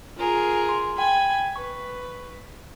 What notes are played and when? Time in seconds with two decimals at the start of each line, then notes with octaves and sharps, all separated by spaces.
0.18 F4 G#4 A#4
0.69 C6
0.98 G5 G#5 B5 G#6
1.56 B4 C#6